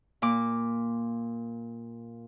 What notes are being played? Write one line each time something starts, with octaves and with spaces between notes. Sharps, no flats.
A#2 D6